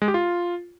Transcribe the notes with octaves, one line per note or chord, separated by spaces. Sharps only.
G#3
G4
F4